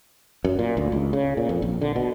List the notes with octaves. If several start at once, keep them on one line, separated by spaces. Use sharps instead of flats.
F#2
A#2
D2
C#2
C#3
A#2
F2
A#1
D3
B2